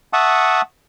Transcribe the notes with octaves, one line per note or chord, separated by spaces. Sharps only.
E5 F#5 A5 C#6 D#6